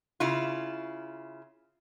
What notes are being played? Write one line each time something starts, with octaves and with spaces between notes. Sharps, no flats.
C#3 E4 F4